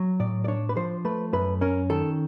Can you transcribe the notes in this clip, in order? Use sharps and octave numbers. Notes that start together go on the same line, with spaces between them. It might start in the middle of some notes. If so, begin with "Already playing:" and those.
Already playing: F#3
A2 D5
D5
D4 C#5
B4
F3 C5
A3 B4
F#2 B4
C#4 A#4
D#3 A4